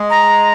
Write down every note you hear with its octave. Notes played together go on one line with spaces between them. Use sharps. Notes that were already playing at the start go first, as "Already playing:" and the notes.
Already playing: G#3
A#5